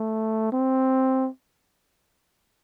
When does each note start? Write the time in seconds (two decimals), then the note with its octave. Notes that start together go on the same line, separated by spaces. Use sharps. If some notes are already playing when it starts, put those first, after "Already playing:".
Already playing: A3
0.52 C4